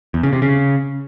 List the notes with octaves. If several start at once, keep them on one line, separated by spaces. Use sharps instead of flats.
E2
C#3
C3
C#3